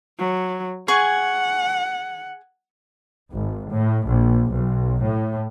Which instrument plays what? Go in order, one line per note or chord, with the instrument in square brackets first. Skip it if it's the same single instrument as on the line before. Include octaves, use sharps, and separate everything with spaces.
[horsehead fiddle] F#3
[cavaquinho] G#4 G#5 C#6 [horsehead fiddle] F#5
[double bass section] G#1
A2
A#1
B1
A2